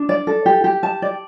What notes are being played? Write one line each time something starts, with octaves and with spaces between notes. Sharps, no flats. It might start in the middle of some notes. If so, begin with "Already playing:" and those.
Already playing: D4
D5
A4
G4
G4
A5
D5